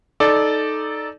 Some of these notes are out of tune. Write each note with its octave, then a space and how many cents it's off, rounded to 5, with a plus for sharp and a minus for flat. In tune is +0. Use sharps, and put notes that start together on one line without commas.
D#4 +0 A4 -15 D5 +0